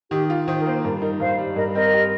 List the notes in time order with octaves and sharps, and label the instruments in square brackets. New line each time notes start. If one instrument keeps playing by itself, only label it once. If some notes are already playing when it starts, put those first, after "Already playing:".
[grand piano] D#3 [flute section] G4
[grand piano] F4
[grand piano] D#3 [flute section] C5
[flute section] A#4
[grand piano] A#3 [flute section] C5
[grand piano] G2 [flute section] A#4
[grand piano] D#4 [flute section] A#4
[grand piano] G2 [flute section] C5 F5
[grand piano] G3
[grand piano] G2 [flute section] A#4 D#5
[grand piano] C4 [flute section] A#4 D#5
[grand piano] G4